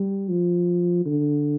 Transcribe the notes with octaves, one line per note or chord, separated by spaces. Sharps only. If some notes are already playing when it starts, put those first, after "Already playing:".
Already playing: G3
F3
D3